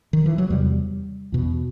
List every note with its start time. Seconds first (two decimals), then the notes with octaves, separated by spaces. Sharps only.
0.13 D#3
0.26 E3
0.38 F#3
0.50 E2 C3 G3
1.32 E2 B2